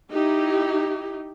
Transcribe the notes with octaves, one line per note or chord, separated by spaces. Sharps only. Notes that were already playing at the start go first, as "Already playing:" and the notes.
D#4 E4 G4